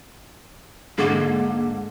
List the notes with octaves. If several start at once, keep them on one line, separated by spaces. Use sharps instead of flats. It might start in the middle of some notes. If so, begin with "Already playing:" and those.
G#2 D3 G#3 A#3